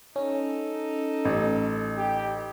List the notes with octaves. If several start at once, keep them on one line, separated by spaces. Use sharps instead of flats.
C#4 D#4 A4
A1
G4